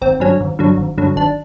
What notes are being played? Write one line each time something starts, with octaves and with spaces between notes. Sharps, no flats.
G#1 C4
G2 D3 F#3 C#4
G#1
G2 D3 F#3
G#1
G2 D3 F#3
G#1 D4